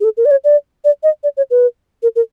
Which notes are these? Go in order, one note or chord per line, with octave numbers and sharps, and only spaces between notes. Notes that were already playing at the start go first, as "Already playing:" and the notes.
G#4
A4
A#4
D5
C#5
D5
D5
D#5
D5
C#5
B4
A#4
A#4